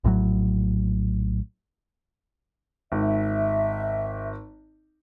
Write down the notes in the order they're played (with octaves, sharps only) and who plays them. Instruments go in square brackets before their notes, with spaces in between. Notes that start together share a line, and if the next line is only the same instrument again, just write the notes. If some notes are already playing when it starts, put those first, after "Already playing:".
[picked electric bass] A#1 A2 C3 F#3
[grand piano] G#1 [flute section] E5